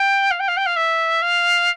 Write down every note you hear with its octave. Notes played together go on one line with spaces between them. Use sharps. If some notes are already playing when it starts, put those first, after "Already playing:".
Already playing: G5
F5
G5
F5
G5
F5
E5
F5